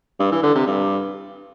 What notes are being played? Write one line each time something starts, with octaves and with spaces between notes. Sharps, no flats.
G2
E3
D3
C3
G2